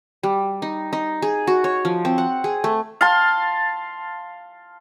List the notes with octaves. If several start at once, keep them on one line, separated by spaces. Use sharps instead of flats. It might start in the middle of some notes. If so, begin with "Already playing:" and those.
G3
D#4
D#4
G#4
F#4
C#5
F3
C4
F#5
G#4
A3
F5 A5 C6